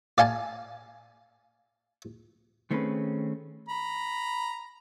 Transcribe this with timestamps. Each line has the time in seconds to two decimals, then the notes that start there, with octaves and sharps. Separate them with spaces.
0.18 D5 F5 G#5 A5
2.71 D#3 A3 C4 C#4 G#4 B4
3.69 A#5 B5